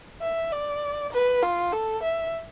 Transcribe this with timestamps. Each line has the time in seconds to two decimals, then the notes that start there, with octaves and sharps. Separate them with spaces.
0.22 E5
0.53 D5
1.12 B4
1.43 F4
1.73 A4
2.03 E5